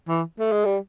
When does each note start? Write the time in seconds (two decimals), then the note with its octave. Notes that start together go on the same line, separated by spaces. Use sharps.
0.08 E3
0.39 A3
0.52 G#3
0.65 G3